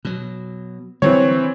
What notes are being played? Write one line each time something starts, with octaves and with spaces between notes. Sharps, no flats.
B2 F#3
D3 E3 F#3 G3 C4 C#5